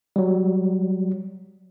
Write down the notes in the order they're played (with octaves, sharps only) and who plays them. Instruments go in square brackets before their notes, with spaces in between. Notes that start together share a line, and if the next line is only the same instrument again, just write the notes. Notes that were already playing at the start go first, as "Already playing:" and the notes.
[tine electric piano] F#3 G3